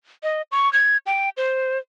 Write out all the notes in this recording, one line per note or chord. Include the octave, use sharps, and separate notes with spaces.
D#5
C#6
G#6
G5
C5